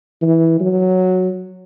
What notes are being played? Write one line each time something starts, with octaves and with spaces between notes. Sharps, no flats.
E3
F#3